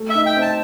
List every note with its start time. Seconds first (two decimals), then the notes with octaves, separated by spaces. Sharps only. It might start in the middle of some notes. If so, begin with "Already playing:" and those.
Already playing: A3
0.10 E5
0.15 D#4
0.26 G5
0.36 C4
0.42 A5